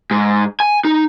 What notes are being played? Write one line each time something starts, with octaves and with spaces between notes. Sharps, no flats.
G#2
G#5
D#4